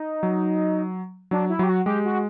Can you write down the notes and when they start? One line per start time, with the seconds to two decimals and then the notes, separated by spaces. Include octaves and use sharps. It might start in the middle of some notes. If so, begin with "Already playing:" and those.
Already playing: D#4
0.23 F#3
1.31 F#3 D4
1.50 E4
1.59 F#3 G4
1.69 F#4
1.86 G#3 G4
2.05 F#4